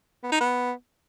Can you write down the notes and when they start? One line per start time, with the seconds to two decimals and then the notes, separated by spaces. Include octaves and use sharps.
0.23 B3
0.32 D#4
0.40 B3